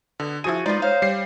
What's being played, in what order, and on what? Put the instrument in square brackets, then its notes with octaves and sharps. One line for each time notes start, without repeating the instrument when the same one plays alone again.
[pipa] B2 [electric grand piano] D3
[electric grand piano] F3 D#7 [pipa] E4 G#4 [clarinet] F#4
[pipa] F3 B4 D5 [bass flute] G#3 [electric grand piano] D#4 [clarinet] F4
[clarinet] C5 [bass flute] C#5 [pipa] F5
[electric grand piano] G3 C7